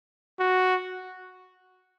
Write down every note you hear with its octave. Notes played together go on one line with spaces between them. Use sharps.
F#4